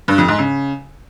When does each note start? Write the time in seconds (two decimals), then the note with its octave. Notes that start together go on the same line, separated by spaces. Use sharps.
0.08 G2
0.18 F2
0.28 G#2
0.39 C#3